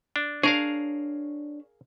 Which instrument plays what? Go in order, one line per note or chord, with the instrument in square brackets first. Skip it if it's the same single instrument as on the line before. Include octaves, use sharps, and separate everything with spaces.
[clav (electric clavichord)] D4
[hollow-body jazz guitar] D4 C#5 [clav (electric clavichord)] G#4 A#4 F5